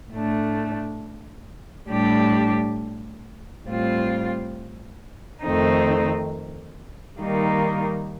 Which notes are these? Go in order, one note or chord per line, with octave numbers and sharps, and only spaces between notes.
A2 A3 D4
A2 G3 D4 G4
A2 G3 C4 F4
F2 D#3 A3 C4 D#4
D#3 G3 A#3 D#4